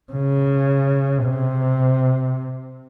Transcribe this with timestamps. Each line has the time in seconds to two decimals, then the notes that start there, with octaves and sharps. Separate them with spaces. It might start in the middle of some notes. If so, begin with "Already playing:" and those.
0.12 C#3
1.25 C3